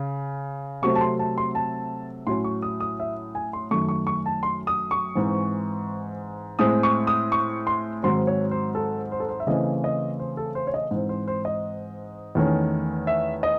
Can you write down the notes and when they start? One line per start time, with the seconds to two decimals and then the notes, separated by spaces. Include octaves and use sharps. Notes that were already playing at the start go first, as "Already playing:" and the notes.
Already playing: C#3
0.82 C3 F#3 A3 C4 C#6
0.95 A5
1.01 C6
1.19 A5
1.38 C6
1.55 A5
2.27 A2 F#3 C#4 C6
2.44 C#6
2.62 D#6
2.80 D#6
3.00 E5
3.35 G#5
3.53 C6
3.71 F#2 D#3 A3 C#6
3.88 C#6
4.07 C#6
4.26 A5
4.43 C6
4.67 D#6
4.91 C#6
5.15 G#2 E3 C4
6.59 A2 G#3 C4 D#6
6.83 C#6
7.07 D#6
7.32 C#6
7.67 C6
8.03 G#2 D#3 F#3 C4 C6
8.27 C#5
8.51 C5
8.75 A4
9.12 C5
9.20 A4
9.29 C5
9.40 E5
9.47 C#3 E3 A3 C4 D#5
9.84 D#5
10.19 C5
10.37 A4
10.55 C5
10.67 C#5
10.74 D#5
10.91 G#2 E3 C4
11.09 C5
11.28 C5
11.45 D#5
12.35 E2 D#3 A3 C#4
13.07 E5
13.43 D#5